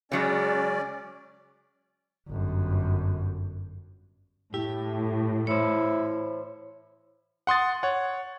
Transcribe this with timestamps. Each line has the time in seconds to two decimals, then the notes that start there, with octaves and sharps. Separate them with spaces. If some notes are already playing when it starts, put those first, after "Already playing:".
0.12 C#3 F#3 G#3 C#4 D5
2.28 G1 F#2
4.54 A2 E4 G4
5.47 E3 E4 C5 C#5
7.47 F#5 C6 D#6 A6
7.83 C#5 F#5